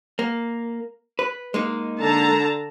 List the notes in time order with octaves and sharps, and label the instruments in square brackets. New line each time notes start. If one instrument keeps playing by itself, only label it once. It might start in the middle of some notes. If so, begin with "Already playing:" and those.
[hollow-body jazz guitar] A#3
B4
G#3 A#3 D#4
[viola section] D3 A5 A#5